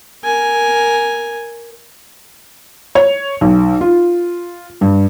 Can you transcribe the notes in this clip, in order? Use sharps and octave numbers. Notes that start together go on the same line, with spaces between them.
A#4 G#5
C#5
B1
F4
G2